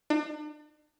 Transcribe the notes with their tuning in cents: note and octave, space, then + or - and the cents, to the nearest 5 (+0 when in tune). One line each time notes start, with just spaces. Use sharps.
D4 +40